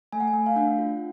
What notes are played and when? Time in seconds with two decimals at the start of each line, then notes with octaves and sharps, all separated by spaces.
0.13 A3 G#5
0.20 F#5
0.28 G#5
0.34 A3
0.46 F5
0.56 D4 F#5
0.79 F4